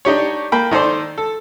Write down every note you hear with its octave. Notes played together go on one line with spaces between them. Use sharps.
D4 D#4 G4 C#5
A#3 G5 B5
D#3 D#4 A4 C5 D5
A4